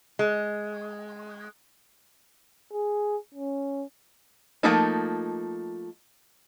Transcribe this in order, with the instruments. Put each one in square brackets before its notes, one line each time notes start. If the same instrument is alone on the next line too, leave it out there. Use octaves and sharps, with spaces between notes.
[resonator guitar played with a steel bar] G#3
[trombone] G#4
C#4
[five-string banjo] F3 A3 A#3 D#4